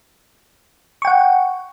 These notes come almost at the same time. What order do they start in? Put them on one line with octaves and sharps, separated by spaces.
C#6 G5 F#5